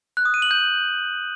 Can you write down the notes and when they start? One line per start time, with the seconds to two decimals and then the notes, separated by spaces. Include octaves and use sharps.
0.17 F#6
0.25 D#6
0.34 D#7
0.42 F#7
0.51 G6